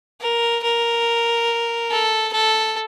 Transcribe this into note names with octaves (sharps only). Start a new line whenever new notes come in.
A#4
A#4
A4
A4